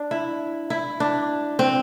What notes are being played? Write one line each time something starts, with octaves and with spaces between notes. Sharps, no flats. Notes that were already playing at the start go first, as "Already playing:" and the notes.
Already playing: D4
E4
E4
D4
C4